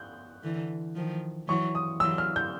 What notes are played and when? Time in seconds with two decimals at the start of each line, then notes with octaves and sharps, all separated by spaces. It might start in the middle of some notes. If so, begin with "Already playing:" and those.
Already playing: F#6 G6
0.43 D3 E3
0.95 D#3 F3
1.48 E3 F#3 C#6
1.75 D#6
2.00 E3 F#3 E6
2.18 F6
2.36 G6